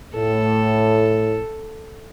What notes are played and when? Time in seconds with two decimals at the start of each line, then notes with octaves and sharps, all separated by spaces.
0.15 A2 A4